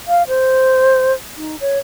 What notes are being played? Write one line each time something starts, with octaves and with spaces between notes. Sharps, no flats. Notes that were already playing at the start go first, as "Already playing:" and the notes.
F5
C5
D#4
C#5